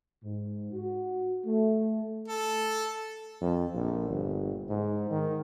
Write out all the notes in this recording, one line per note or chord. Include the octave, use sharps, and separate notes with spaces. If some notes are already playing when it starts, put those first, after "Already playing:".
G#2
F#4
A3
A4
F2
A#1
G1
G#2
D#3